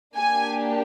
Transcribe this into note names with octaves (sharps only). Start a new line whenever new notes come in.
A#3 D4 G4 G#5